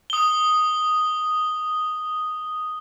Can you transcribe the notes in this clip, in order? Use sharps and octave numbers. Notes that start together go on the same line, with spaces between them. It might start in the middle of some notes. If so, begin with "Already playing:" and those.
D#6 G7